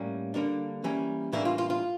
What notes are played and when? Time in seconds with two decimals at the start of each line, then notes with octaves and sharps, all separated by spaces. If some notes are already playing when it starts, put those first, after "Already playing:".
Already playing: A2 G3 A#3 C#4
0.34 D3 G3 A#3 D4
0.84 E3 G3 A#3 C#4
1.32 A2 E3 G3 A#3 D4 E4
1.45 F4
1.58 F4
1.70 F4